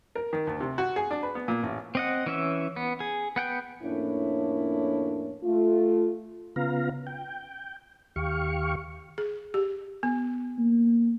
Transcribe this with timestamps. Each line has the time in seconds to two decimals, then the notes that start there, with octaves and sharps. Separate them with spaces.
0.15 A#4
0.33 D#3
0.47 D2
0.60 C3
0.78 F#4
0.96 G#4
1.11 D4
1.23 B4
1.35 B3
1.48 A#2
1.63 A1
1.95 C4 D#5 F#5
2.26 E3 C#4 E5
2.76 B3
3.00 G#4
3.36 B3 F#5 G5
3.83 F2 A2 A#3 C#4 D4 E4
5.44 A3 F4
6.56 C#3 B3 F4 F5 A#5
7.07 G5
8.16 D#2 G4 F5 C#6
9.18 G#4
9.54 G4
10.03 B3
10.58 A#3